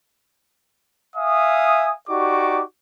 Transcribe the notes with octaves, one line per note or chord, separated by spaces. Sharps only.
E5 F5 G#5 D#6
D#4 F#4 G4 D5 C#6 D6